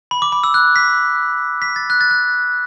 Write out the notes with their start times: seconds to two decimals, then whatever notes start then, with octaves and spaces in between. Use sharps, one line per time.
0.11 B5
0.22 D6
0.32 B5
0.44 E6
0.54 F#6
0.76 B6
1.62 B6
1.76 A6
1.90 F#6
2.01 A6
2.11 F#6